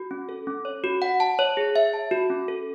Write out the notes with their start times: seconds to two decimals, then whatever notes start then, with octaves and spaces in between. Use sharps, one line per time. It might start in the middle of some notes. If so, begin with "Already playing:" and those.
Already playing: F#4
0.11 C#4
0.29 A4
0.47 C#4
0.65 C#5
0.84 F#4
1.02 F#5
1.20 A5
1.39 C#5
1.57 G#4
1.76 E5
1.94 A5
2.11 F#4
2.30 C#4
2.48 A4